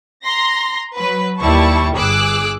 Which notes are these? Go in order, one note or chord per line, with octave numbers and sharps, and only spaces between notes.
A#5 C6 A#6
F#3 B4
D#2 G3 E4 A5 C#6
G1 G#4 D6 E6 F#6